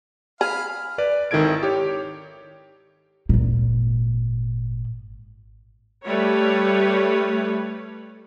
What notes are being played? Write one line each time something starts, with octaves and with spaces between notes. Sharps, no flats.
G#4 F5 B5 F6
B4 D5
G#1 D#3 E4 A4 G#6 D7
G4 C#5
G#1 A#2
G3 A3 B4 C#5